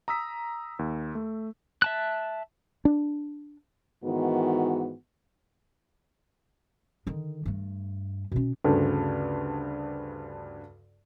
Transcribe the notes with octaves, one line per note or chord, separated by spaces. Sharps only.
A#5 D#6 E6 B6
D#2
A3
E5 A5 F#6
D4
G#2 D#3 E3 B3 F#4
D3 D#3
G2 A3
B2 C#4
D2 G2 C#3